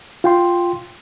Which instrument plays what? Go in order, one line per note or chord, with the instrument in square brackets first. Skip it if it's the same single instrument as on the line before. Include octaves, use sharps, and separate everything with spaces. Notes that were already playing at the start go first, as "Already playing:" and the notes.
[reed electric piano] F4 G5 C6